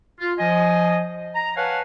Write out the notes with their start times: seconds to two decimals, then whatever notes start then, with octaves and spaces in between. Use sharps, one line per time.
0.20 F4
0.39 F3 D#5 G#5
1.36 A#5
1.57 B4 C#5 F5 F#5 G#5 A5